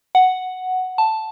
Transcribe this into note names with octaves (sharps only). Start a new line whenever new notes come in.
F#5
A5